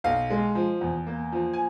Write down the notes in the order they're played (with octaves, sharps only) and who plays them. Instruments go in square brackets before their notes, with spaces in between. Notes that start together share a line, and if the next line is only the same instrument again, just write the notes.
[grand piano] B1 F5
G#3
F3
E2
A#3
F3
G#5